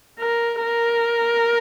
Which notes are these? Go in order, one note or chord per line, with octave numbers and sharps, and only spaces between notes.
A#4
A#4